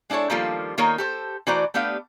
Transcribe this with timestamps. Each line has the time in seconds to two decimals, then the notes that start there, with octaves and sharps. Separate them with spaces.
0.10 G#3 D4 E4 A4 C#5
0.30 D#3 F3 G3 A#3 F4 A4
0.78 D#3 A#3 D#4 F4 A#4 C#5
0.98 G4 A4 C5
1.47 E3 A3 F#4 C5 D5 A#5
1.74 A3 B3 D4 G4 F5